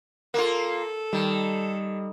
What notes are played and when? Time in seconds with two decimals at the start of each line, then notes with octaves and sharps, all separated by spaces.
0.34 A#3 F4 A4 A#4
1.13 D#3 G3